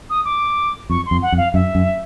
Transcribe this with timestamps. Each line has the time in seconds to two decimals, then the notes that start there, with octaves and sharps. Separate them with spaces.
0.10 D#6
0.25 D6
0.90 F2 C#6
1.06 C6
1.11 F2
1.22 F#5
1.32 F2
1.38 F5
1.54 F#2 E5
1.75 F#2